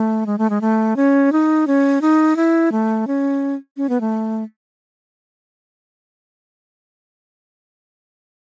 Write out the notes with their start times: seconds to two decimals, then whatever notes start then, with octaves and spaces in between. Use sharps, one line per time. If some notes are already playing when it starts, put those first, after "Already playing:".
Already playing: A3
0.26 G#3
0.38 A3
0.50 G#3
0.61 A3
0.96 C#4
1.32 D#4
1.67 C#4
2.02 D#4
2.36 E4
2.72 A3
3.07 C#4
3.77 C#4
3.89 B3
4.01 A3